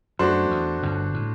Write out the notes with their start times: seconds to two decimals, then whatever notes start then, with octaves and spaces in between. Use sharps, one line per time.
0.19 F#2 A3 D4 F#4 C5
0.51 E2
0.83 G1 G2
1.14 A2